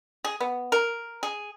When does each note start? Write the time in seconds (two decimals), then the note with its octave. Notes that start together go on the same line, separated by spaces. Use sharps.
0.25 G#4
0.41 B3
0.72 A#4
1.23 G#4